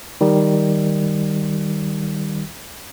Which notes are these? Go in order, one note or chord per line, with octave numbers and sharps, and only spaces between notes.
D#3 G3